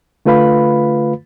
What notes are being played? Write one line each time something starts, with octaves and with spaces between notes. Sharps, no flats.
D3 A3 F4 B4 F5 B5